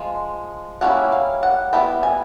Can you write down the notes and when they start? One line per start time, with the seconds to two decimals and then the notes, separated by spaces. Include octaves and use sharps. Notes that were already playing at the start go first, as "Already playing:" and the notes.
Already playing: F3 G#3
0.81 G3 A#3 C#4 E4 F#5
1.12 F5
1.43 F#5
1.73 G3 B3 E4 G5
2.03 G#5